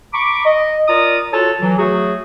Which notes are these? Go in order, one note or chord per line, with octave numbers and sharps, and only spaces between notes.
A#5 B5 C#6 D6
D#5
F4 A#4 D5 A#5 D#6
F4 F#4 A4 C#5 A5
E3 F#3
F#3 A3 F#4 G#4